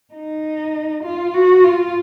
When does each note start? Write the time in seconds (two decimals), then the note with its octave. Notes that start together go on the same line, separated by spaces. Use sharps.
0.14 D#4
1.04 F4
1.34 F#4
1.64 F4